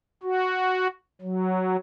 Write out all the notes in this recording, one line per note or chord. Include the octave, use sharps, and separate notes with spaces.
F#4
F#3